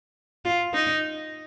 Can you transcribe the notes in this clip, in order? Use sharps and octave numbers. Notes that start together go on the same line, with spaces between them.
F4
D#4